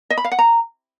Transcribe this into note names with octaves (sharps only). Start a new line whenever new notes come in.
D#5
B5
F5
F#5
A#5